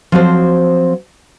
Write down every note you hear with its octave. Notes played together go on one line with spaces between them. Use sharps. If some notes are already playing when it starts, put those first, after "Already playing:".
F3 F#3 C4 F#4 A4 C5